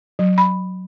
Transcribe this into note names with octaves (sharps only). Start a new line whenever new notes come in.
F#3
B5